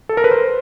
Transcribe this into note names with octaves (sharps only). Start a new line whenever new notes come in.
A4
A#4
B4
C5